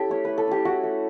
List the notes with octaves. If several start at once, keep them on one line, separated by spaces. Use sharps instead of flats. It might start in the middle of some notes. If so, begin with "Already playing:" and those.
Already playing: C#4 E4 G4 A4
A3 C#5
A3 B4
A4
C#4 G4
E4 F#4
A3